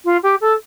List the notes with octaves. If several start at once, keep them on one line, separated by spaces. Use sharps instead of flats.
F4
G4
A4